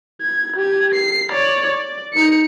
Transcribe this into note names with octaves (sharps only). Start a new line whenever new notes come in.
G#6
G4 G#6
C7
C#5 D5
D5
D#4 C#7